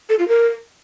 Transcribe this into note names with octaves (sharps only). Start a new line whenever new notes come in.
A4
F4
A#4